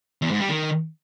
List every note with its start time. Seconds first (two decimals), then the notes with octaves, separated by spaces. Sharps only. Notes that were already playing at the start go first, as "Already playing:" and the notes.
0.22 E2
0.31 G#2
0.40 G3
0.49 D#3